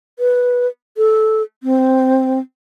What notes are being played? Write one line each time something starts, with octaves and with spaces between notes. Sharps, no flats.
B4
A4
C4